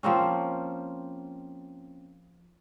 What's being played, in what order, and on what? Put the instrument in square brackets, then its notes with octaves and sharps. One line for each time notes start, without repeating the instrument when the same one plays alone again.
[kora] F3 A#3 C4 C#4